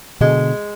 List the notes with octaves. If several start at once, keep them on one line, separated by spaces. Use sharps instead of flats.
B2 D3 G#3